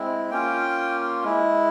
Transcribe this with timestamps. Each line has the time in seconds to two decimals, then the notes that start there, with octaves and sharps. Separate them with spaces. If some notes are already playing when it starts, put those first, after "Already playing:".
Already playing: G#3 C4 E4
0.31 A#3 C#4 F4 G5
1.24 G#3 E4